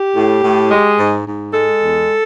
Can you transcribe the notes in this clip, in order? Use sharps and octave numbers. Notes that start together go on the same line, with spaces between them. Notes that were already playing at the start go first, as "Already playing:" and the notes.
Already playing: G4
A2
A2
G#3
G#2
G#2
G#3 A4
E2